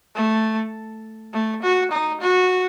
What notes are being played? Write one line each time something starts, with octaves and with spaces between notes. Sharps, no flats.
A3
A3
F#4
D#4
F#4